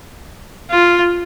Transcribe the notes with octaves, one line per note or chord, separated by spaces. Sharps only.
F4